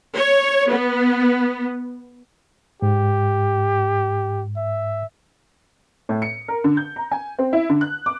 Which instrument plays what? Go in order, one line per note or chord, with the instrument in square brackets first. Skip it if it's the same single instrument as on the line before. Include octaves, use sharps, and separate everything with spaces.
[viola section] C#5
B3
[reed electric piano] G#2 [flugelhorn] G4
[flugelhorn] E5
[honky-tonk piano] A2
C#7
A#4
D3
G6
A#5
G#5
C4
E4
D3
F#6
D6